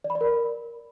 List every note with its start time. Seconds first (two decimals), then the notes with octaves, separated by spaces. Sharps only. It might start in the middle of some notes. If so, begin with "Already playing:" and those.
0.04 D5
0.10 B5
0.15 D5
0.21 A#4